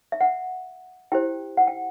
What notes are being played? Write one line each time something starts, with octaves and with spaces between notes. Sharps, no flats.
E5
F#5
E4 G4 C5 G5
F#5
G5